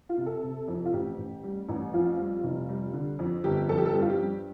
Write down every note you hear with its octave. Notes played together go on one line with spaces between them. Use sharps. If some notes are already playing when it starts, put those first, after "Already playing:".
F4
C3
A4
C3
F2
F4
A1 G4
A1
G3
A1
F2 F4
G3
F1
G3
D3
F2
G1 G4
F2 A4
G4
A4
G2 G4
F4
G4
G2